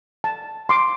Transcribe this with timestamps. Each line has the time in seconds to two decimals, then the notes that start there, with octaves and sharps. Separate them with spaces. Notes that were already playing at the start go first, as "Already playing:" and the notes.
0.24 A5
0.69 C6 D6